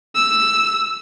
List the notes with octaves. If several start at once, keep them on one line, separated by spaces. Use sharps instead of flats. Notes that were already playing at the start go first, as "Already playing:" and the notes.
E6